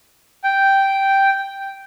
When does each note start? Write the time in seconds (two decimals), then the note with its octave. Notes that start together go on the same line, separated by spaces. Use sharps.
0.44 G5